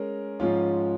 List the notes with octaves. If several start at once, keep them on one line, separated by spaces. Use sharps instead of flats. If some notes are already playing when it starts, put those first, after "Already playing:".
Already playing: G#3 C#4 A#4
G#2 F3 C#4 F4